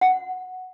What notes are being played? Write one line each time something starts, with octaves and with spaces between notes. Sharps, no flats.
F#5